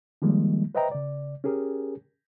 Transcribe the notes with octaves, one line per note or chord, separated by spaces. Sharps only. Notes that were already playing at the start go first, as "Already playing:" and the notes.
D#3 F3 G3 G#3 A#3
B4 C5 D#5 E5 G5 A#5
C#3 D5
C#4 G4 G#4 A#4